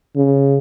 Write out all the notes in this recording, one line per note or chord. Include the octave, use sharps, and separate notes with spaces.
C#3